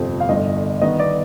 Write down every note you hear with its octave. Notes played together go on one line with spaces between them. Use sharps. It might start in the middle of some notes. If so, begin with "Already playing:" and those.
Already playing: G1 F2 C3 F3 C4
F5
G1 G2 D3 D#5
G2 D#3 B3 D#5
D5